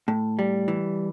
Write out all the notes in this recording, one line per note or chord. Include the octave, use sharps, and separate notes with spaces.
A2
G3
E3